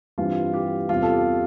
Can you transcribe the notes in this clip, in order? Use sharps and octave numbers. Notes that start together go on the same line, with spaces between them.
G2 E3 G3 C4 F4
G4
E2 C3 G3 C4 F4
A4
G4